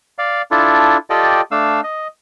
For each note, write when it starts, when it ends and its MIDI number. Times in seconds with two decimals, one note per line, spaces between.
0.18 0.42 74
0.18 0.42 77
0.51 0.97 62
0.51 0.97 64
0.51 0.97 65
0.51 0.97 69
1.10 1.41 65
1.10 1.41 67
1.10 1.41 69
1.10 1.41 74
1.10 1.41 75
1.10 1.41 79
1.51 1.81 57
1.51 1.81 62
1.51 1.81 77
1.51 1.81 88
1.84 2.08 75